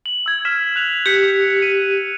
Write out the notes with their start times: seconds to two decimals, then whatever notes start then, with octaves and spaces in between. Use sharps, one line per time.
0.06 F#7
0.26 E6 G#6
0.45 F6 B6 E7
0.76 F#6 F7
1.06 G4 B6 C#7 F7
1.60 B6 D#7